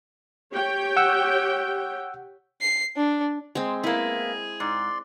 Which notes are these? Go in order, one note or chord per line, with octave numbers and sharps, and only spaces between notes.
G4 C#5 G5
F#5 E6
C7
D4
G#3 C4
A#3 B3 E4 G#4
G#2 D5 C6